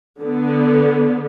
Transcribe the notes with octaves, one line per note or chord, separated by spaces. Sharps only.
D3 B3